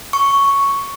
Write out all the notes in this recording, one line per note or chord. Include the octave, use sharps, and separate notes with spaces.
C#6